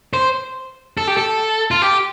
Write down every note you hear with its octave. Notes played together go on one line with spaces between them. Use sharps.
C5
A4
G4
A4
F4
G4